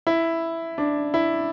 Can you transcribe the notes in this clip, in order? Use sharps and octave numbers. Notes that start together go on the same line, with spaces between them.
E4
D4
E4